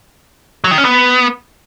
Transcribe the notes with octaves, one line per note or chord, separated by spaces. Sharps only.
F#3
D#3
C#4
B3